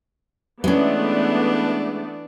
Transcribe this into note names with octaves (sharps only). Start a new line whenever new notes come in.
E3 G#3 A3 B3 C#4 D4 D5